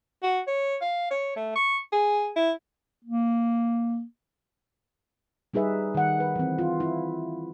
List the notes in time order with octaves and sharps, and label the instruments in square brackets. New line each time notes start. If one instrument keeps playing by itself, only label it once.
[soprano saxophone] F#4
C#5
F5
C#5
A3
C#6
G#4
E4
[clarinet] A#3
[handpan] G3 D#4 G#4 B4 E5
D#3 F#5
B4
E3 C4
F4
E4